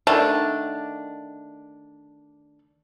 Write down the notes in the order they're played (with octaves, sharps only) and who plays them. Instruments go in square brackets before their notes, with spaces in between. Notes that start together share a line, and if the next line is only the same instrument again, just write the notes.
[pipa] D3 D#3 A3 D4